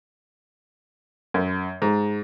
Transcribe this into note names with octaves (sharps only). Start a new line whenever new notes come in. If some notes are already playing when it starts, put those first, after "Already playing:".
F#2
G#2